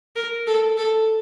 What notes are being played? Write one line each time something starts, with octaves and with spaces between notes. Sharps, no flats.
A#4
A4
A4